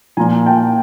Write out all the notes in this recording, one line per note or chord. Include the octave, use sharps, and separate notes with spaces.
A#2 F3 G#5 A#5
G5 A5